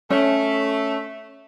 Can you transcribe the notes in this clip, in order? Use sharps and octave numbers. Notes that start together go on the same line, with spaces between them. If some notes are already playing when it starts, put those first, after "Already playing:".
A3 C#4